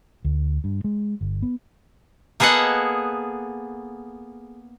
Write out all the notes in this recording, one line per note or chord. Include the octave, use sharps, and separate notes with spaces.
D2
G2
G#3
G1
B3
A#3 B3 G#4 A4 D#5 F#5